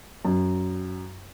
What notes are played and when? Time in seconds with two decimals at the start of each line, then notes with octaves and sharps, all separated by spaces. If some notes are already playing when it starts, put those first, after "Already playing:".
0.25 F#2